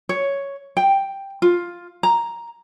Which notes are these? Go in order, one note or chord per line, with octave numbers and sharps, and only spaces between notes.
C#5
G5
F4
A#5